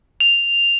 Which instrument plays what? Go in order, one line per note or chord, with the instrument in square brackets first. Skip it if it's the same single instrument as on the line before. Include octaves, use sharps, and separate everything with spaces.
[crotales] F7